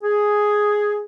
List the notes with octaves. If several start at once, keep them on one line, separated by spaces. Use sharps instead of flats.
G#4